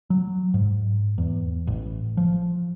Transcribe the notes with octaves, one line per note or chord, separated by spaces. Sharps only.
F#3
G#2
E2
A1
F3